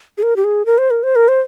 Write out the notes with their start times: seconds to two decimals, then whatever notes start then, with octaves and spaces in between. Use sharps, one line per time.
0.18 G#4
0.23 A#4
0.36 G4
0.44 G#4
0.66 A#4
0.78 C5
0.91 A#4
1.03 C5
1.16 A#4
1.28 C5